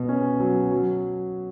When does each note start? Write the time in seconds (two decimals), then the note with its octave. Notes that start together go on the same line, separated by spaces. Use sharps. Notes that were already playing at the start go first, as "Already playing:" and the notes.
Already playing: B2
0.09 C#4
0.40 F#3
0.71 F#3